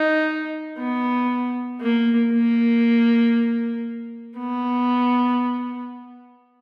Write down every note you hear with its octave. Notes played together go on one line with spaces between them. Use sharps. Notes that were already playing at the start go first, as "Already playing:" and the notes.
Already playing: D#4
B3
A#3
A#3
B3